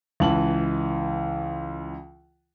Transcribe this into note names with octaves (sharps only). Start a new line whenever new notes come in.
C#2 E3 A5 F#7